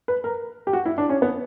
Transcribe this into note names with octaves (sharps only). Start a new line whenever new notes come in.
B4
A#4
G4
F#4
E4
D4
C#4
B3